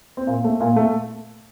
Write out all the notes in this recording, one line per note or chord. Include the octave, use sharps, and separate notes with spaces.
C4
A#2 A#3
A3
A#2 A#3
A3